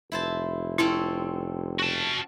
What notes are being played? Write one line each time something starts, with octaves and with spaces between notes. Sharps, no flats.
F1 E4 C5 A5
C4 C#4 E4 A4
F#4 A5